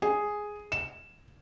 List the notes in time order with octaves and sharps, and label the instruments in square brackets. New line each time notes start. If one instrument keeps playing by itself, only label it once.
[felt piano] G#4
E7